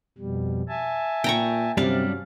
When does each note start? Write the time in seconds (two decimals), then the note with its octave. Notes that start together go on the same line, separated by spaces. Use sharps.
0.18 F2 B2 G3
0.68 E5 G#5 A5
1.24 A#2 G5 A#5 C#6
1.77 G2 C3 F#3 G3 C#4 D4 F5